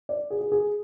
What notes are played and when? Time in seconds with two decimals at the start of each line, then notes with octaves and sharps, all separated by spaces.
0.09 D5
0.30 G#4
0.41 G#4
0.52 G#4